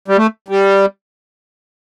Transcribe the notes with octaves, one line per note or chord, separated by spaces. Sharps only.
G3
A3
G3